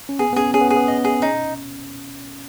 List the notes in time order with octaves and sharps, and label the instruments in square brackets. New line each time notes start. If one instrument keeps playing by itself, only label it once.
[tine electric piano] C#4
[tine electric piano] B3 [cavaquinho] G#4
[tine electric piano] B3
[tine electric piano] C#4 [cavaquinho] G#4
[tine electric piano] C#4 [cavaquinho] G#4
[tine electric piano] B3
[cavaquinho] G#4
[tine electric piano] B3
[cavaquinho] D#5
G#4
[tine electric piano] C#4 [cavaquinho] D#4